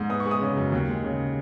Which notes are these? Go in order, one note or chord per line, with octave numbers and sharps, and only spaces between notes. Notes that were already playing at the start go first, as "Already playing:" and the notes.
Already playing: G#2
B3 D#6
C#6
G#3
D#6
C#3
F#2
D#2
G#3
C#3